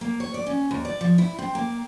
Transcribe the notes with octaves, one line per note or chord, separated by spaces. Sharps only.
A#3
C#5
D5
C#4
D#2
D5
F3
E4
C4
A#3